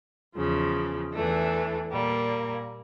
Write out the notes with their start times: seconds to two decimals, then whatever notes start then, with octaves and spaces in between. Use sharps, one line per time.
0.35 E2 C#3 F3
1.12 E2 E3 A3 D4
1.89 A#2 G3 A#3